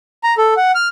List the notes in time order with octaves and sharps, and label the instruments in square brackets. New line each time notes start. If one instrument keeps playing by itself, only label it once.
[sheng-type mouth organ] A#5
A4
F#5
F6